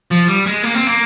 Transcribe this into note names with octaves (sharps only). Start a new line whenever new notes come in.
F3
G3
G#3
A#3
C4
A#3